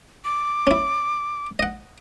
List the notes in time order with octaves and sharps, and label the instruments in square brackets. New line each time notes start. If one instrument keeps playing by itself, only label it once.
[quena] D6
[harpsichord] C#4 E4
D#5 F#5